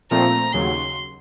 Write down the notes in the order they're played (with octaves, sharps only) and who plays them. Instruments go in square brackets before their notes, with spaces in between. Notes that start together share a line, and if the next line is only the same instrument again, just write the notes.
[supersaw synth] A#2 F3 A3 C4 [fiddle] A#5
[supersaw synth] D#2 C#3 F#3 [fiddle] C6